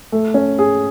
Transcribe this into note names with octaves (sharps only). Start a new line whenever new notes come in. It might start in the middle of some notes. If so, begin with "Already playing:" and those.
A3
C#4
G#4